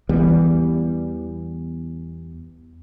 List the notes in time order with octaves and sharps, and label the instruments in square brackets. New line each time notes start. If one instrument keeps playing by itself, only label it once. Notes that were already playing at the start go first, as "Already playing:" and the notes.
[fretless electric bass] E2 E3 G3 B3